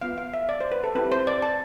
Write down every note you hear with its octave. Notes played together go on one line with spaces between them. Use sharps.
B3 F4 F5
F5
E5
D5
C5
B4
A4
C4 E4 G4 B4
C5
D5
A5